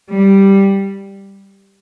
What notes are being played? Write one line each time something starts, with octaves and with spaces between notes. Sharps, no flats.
G3